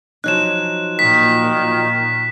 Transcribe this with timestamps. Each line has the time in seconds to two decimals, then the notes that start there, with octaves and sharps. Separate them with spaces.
0.24 F3 F#3 D#4 F#6 E7
0.99 A#2 D#3 B6